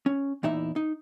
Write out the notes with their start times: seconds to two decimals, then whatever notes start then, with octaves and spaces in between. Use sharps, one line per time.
0.06 C#4
0.43 E2 A#2 D#4 E4 E5
0.76 D#4